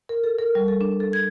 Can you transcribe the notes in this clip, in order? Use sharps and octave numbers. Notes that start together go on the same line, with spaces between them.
A#4
A4
A#4
G3
A4
D4
A4
G#6